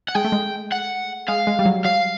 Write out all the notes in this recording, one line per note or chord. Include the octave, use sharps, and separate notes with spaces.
F#5
G#3 G5
A3
G#3
F#5
G#3 F5
G#3
G3
F#3
F#3 F5